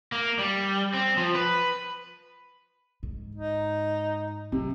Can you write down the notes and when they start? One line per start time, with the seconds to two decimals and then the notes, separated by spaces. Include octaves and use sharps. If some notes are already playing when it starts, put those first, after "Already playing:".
0.12 A#3
0.39 G3
0.94 C4
1.17 F3
1.35 B4
3.03 G#2
3.35 D#4
4.52 C3 F#3